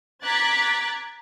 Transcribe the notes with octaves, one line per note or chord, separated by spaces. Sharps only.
A#5 D6 F#6 G#6 A6 B6